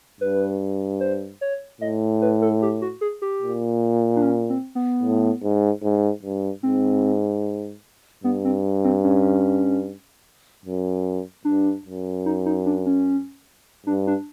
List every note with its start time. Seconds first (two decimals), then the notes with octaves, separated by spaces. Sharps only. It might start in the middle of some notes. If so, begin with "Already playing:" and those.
0.20 G2 B4
1.00 C5
1.41 C#5
1.81 A2 D#5
2.22 B4
2.42 A4
2.62 G4
2.82 F#4
3.01 G#4
3.22 G4
3.42 A#2
4.16 D4
4.22 C#4
4.50 C4
4.75 B3
5.03 A2
5.43 G#2
5.83 G#2
6.23 G2
6.63 G#2 C4
8.24 G2 B3
8.45 C4
8.84 C4
9.04 C#4
10.65 F#2
11.45 G2 D4
11.85 F#2
12.26 D#4
12.46 D#4
12.66 D4
12.86 C#4
13.86 G2 D4
14.07 D4